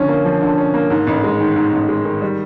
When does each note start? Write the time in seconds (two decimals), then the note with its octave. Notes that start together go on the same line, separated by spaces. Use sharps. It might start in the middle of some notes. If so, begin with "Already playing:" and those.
Already playing: D3 F3 C#4
0.08 A#3
0.25 F3
0.42 D3
0.58 C#4
0.74 A#3
0.90 G#2
1.07 A1
1.24 G#3
1.40 D#3
1.56 G#2
1.72 A1
1.88 G#3
2.05 D#3
2.22 G3